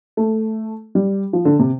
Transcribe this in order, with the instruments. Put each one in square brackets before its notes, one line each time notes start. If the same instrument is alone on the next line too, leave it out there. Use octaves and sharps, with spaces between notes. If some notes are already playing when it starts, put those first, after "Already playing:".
[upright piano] A3
G3
F3
D3
C3